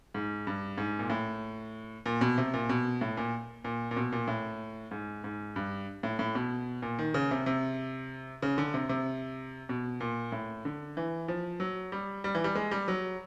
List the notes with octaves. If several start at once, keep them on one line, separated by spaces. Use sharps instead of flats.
G#2
G2
G#2
A#2
A2
A#2
B2
C3
A#2
B2
A2
A#2
A#2
A#2
B2
A#2
A2
G#2
G#2
G2
A2
A2
B2
A#2
D#3
C#3
C3
C3
C#3
D3
C3
C3
B2
A#2
A2
D3
E3
F3
F#3
G3
G3
E3
G3
G#3
G3
F#3